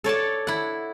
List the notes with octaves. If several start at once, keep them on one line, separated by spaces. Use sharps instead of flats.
A4 C#5 D5 A5
E4 F#5